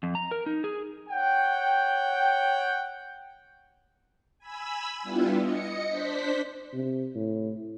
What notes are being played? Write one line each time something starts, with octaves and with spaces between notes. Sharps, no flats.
F2
A#5
A#4
D#4
G#4
C#5 F#5 G5
G#5 B5 E6
G3 B3 D4 E4 F4 G4
D#5 C#7
D4 C5 B6
C3
A2